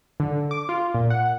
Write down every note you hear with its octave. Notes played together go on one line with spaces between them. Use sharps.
D3
D6
F4
A#2
F#5